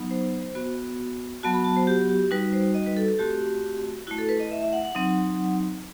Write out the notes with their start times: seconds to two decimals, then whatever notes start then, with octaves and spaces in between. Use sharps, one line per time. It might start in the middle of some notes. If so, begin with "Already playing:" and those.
Already playing: F#3 B3 D#4
0.11 C5
0.55 B3 F#4
1.43 F#3 B3 F#4 A5
1.54 B5
1.64 A5
1.77 C5
1.87 G4
2.09 G4
2.31 G3 D#4 F#4 B4
2.53 C5
2.74 D#5
2.86 B4
2.97 A4
3.08 A4
3.19 A3 C4 F#4 G4
4.07 E4 F#4
4.11 A3
4.18 A4
4.29 B4
4.40 D#5
4.51 E5
4.63 E5
4.73 F#5
4.85 F#5
4.95 F#3 C4 D#4